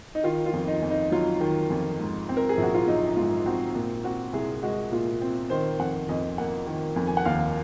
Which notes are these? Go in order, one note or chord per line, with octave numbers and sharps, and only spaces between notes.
D#4
D#3 F4
F4
F2
D#4
F2
D#4
F#3 F4
D#3
F2
G#2
C4
A#4
G#4
A#1
F#4
F4
F#3 D#4
G#2 F4
C4 F#4
A#2
C4 F#4
C2 G#4
G#3 F#4
A#2 F4
C4
D#3 C5
F2 F#5
F2 D#5
A#3 F#5
D#3
F2
G#5
F#5
D#2 F5